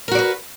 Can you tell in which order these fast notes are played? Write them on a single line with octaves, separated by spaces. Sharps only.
A#4 F#4 D5 B4